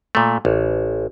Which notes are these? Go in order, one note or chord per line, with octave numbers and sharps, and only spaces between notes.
A#2 A3
A1